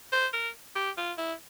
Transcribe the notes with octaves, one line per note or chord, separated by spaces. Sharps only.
C5
A#4
G4
F4
E4